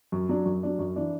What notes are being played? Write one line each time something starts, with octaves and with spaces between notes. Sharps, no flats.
F#2
F#3 D4
F#2
F#3 D4
F#2
E3 D4